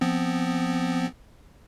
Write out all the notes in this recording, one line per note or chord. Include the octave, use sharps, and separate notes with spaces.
F3 B3 C4